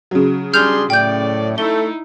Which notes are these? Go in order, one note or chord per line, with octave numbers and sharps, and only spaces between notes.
C#3 F#3
G3 D4 G#4 C6 F6 G6 F7
A2 D5 G5 G6
A3 D#4 E4 G7